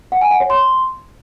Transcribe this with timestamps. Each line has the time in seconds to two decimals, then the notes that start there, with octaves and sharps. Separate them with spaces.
0.12 F#5
0.21 G#5
0.31 F#5
0.40 C#5
0.50 C6